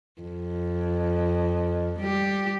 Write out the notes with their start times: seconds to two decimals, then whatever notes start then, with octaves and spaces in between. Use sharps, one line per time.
0.22 F2
2.00 G3 G4